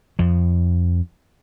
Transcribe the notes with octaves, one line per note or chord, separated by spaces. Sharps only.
F2 F3